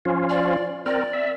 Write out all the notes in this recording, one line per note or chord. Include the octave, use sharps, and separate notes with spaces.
F3 C#4 F4
D5
C4 A#4 D5
E5